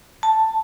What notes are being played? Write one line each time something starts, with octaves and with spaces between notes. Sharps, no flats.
A5